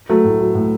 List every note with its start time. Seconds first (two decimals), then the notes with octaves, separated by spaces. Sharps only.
0.09 F#3 A3
0.25 A2
0.40 F#3
0.55 A2